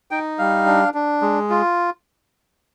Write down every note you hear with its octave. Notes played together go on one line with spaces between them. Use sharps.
D#4 G5
G3 F5
D4
D4
G#3
F4